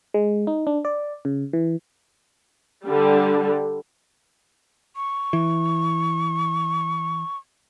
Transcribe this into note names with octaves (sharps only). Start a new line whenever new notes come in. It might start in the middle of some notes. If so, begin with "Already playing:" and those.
G#3
D#4
D4
D5
C#3
E3
D3 G3
C#6
E3